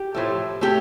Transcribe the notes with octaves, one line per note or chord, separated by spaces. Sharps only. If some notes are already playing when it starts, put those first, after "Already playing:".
Already playing: G4
A2 F3 A3
A2 F3 A3 G4